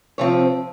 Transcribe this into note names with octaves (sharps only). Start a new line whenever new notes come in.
C3 F3 C4 C#5